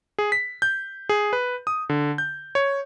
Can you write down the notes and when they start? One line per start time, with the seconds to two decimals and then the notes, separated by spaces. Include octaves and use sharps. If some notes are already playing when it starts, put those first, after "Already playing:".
0.19 G#4
0.32 B6
0.62 G6
1.09 G#4
1.33 B4
1.67 D#6
1.89 D3
2.18 G6
2.55 C#5